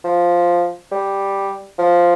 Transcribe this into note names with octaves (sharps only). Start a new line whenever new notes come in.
F3
G3
F3